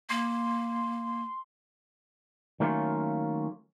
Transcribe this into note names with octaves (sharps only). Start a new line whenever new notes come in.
A#3 C6
D#3 F#3 A3 A#3 C#4 F4